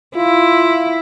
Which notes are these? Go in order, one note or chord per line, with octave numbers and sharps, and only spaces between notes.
E4 F4